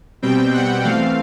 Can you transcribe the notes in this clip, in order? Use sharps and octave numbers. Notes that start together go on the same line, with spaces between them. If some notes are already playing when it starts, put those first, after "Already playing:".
B2 G3 C4 G5
F#5
E3 A3 C4 F5